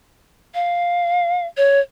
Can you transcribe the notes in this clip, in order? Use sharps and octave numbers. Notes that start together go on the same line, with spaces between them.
F5
C#5